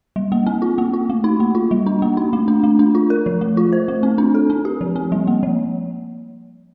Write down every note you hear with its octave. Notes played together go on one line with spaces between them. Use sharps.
G3
A#3
C4
F4
A#3
F4
A3
D#4
A#3
F4
G3
D4
A#3
D#4
A3
D4
A3
D4
F4
A#4
F3
A3
F4
C5
A3
C4
D4
A4
C4
G4
F3
C4
G3
A#3
F3